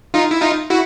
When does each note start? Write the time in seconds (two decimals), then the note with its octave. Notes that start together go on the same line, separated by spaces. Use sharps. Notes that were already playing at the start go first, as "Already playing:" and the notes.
0.14 D#4 F4
0.31 E4
0.41 D#4 F4
0.70 E4 F#4